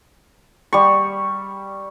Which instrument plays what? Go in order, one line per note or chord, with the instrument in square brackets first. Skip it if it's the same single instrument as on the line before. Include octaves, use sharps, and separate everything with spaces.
[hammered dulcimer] G3 C#6